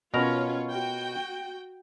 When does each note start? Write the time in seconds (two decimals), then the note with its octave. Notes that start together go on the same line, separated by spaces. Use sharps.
0.14 B2 C#4 F4 A#4 C#5 A#5
0.70 F#4 G5